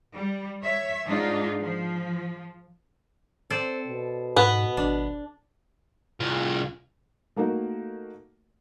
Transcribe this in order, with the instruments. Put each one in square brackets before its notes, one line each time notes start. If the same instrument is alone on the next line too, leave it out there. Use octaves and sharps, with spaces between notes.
[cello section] G3
C#5 E5
G#2 D4 D#4 F4
F3
[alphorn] C4 [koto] A4 C5 D5
[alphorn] B2
[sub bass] G#2 [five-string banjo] B3 F#5
[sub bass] G#1 [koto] D4
[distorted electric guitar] C2 F4
[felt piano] A3 A#3 D#4 F#4 A#4